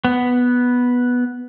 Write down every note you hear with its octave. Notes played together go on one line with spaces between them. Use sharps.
B3